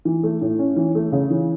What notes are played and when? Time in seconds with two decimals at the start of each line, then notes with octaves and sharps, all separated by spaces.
0.05 E3
0.23 A3
0.41 A2
0.59 C#4
0.76 E3
0.95 A3
1.12 C#3
1.30 E3